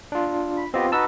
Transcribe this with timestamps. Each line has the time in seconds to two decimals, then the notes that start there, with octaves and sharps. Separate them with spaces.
0.12 D4 F4
0.57 B5
0.74 B3 C4 F4 G4 D#5
0.92 D#4 F#4 B4 A5 E6